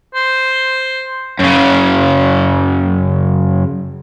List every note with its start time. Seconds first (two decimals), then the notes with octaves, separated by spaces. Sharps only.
0.15 C5
1.39 F#2 C#3